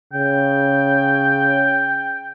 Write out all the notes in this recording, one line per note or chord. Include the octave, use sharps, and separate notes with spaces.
C#3 G5